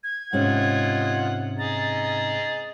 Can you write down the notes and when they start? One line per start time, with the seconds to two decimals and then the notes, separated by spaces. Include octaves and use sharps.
0.04 G#6
0.33 G#2 C3 C#4 F4 D#5 F#5
1.59 G#4 D#5 A#5 A6
2.04 A6